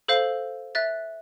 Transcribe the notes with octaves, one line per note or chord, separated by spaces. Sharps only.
A4 C5 F5
E5 F#6 A6